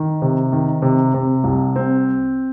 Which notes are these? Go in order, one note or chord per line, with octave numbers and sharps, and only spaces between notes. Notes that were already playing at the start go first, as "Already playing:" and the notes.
Already playing: D#3
C3
D#3
C3
C3
C2
C4